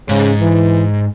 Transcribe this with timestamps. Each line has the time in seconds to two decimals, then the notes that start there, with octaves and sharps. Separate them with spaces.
0.09 G#2 C#3
0.40 E3